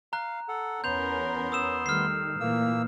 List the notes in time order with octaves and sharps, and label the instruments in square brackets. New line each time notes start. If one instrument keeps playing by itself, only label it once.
[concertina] F5 [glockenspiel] A#5 F#6
[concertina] A4 F#5
[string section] E2 C#4 A#4 [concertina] B3 C6 [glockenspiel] G6 F7
[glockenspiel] D#6 E6 E7
[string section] D#3 G3 A3 [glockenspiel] F6 C7
[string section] A#2 E3 [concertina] A#3 E6